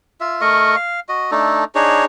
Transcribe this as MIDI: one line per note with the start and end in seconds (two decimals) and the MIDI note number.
0.21 0.41 65
0.21 0.41 76
0.41 0.76 57
0.41 0.76 70
0.41 0.76 75
0.41 0.76 85
0.76 1.00 77
1.09 1.31 66
1.09 1.31 75
1.31 1.64 57
1.31 1.64 62
1.31 1.64 63
1.31 1.64 69
1.75 2.05 62
1.75 2.05 63
1.75 2.05 68
1.75 2.05 73